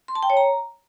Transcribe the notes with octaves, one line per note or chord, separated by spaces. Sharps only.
C6
A5
G5
C#5
A#5